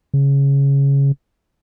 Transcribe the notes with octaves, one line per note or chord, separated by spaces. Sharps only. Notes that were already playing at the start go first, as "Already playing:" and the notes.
C#3